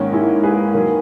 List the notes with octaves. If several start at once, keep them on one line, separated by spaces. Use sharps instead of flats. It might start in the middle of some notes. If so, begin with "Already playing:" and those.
Already playing: G#2 D#3 A#3 C#4
E4 G#4
G#4 B4
D#3 F#3 A#3